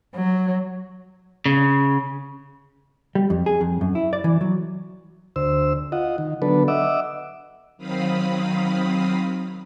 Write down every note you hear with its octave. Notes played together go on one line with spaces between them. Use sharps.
F#3
C#3
G3
F2
G#4
F2
F#2
E4
D5
E3
F#3
D2 C5 E6
F4 D#5 F#5
D#3
D3 F#3 B3 D4 A4 B4
D#5 E5 F#5 D6 E6
D#3 F#3 C4 F5 B5 D#6